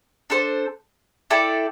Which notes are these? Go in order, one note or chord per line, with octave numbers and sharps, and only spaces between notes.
D4 A4 C5
E4 A4 D5 G5